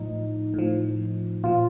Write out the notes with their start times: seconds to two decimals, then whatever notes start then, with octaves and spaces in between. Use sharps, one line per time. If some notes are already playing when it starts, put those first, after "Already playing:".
Already playing: A2 F3 D#4
0.54 A2 F3
1.44 A#2 F3 F4